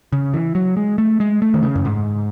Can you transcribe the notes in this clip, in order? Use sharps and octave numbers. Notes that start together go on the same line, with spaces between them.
C#3
E3
F#3
G#3
A3
G#3
A3
D#3
C#3
F#2
G#2